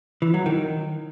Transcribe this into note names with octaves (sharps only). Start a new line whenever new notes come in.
E3
F#3
D#3